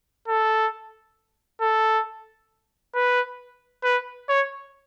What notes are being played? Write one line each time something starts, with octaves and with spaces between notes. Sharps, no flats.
A4
A4
B4
B4
C#5